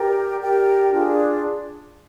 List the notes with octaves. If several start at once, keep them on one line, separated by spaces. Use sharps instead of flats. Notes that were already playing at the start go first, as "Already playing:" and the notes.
Already playing: G4 A#4 D5 G5
G4 A#4 D5 G5
D4 F4 G#4